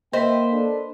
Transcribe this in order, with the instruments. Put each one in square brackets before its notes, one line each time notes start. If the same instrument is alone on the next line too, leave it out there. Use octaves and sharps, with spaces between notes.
[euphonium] A#3 [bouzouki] B4 C5 [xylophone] D#5 B6 [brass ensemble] E5 G5
[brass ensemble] D4 A4